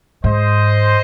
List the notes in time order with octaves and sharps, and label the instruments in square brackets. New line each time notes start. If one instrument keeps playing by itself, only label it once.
[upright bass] G#2 [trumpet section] C5 D#5